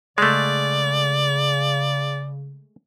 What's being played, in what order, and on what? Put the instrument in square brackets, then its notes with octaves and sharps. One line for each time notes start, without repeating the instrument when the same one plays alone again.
[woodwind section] C#3 [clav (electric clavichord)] G#3 A3 [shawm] D5